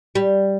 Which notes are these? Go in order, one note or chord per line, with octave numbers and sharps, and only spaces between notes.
G3